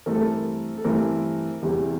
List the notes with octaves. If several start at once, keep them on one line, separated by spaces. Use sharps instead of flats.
G2 E3 A3 C4 A#4
A4
A#4
A4
G2 E3 A3 C4 A#4
E2 C3 E3 G3